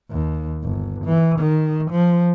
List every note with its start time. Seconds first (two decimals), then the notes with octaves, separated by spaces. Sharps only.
0.11 D#2
0.63 G1
1.05 E3
1.40 D#3
1.91 F3